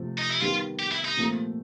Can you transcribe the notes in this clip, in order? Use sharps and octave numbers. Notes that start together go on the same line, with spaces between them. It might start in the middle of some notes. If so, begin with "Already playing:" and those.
Already playing: C3 F3 A3
D#4
E4
D#3 G3 B3 F4
G4
E4
D#4
A#2 F3 A3 C4